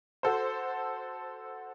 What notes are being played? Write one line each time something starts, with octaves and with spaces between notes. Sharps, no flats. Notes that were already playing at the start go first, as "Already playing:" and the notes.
F#4 A4 C5